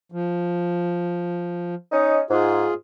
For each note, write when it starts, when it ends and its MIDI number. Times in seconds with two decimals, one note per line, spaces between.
0.12 1.75 53
1.92 2.19 61
1.92 2.19 63
1.92 2.19 75
2.30 2.68 44
2.30 2.74 65
2.30 2.74 68